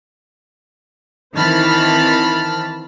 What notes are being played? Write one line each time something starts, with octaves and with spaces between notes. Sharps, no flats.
D#3 E3 C4 A5 B5 F6